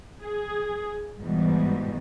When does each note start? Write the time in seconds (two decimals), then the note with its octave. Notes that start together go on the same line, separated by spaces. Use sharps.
0.21 G#4
1.20 G#2 B2 E3 G3